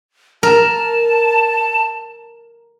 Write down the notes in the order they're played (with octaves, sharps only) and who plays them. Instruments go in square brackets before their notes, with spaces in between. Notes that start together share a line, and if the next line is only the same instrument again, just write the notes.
[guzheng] A#4 [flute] A5